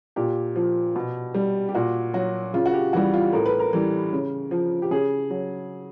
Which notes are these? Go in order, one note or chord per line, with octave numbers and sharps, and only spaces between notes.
A#2 G4
F3
B2
G3
G4
A#2 F#4
F#3 F#4
C#3 F4
F#4
G4
E3 G3 F#4
F4
A2 A#4
B4
A#4
E3 G3
C#3
F3
G4
C#3 G#4
F#3